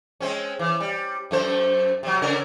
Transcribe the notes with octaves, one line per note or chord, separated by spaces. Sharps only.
G#3 C4 C#4
E3
G3
F#2 A3 C5
C3 F#3
C#3 C#4 A#4